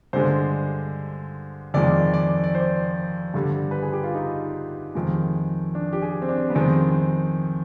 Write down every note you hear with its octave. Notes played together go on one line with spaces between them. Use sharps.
G2 D3 G#3 C5
F2 D#3 G#3 D5
D5
D5
C5
G2 D3 G3
B4
G#4
G4
F4
D#4
F2 D#3 G#3
D4
G4
G#4
C4
D4
B3
F2 D#3 G#3 C4